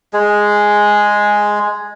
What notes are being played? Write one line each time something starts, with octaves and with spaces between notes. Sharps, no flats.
G#3 G#4